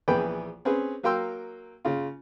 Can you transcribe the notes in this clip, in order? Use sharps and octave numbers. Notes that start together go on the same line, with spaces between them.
A#1 E3 B3 G#4 G5 B5
C4 C#4 G#4 B4
F#3 A#3 F5 G5 C6 E6
C#3 F4